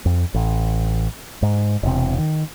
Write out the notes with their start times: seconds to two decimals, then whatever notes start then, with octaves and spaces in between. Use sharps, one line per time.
0.05 F2
0.34 A1
1.42 G#2
1.83 E1 C3
2.18 D#3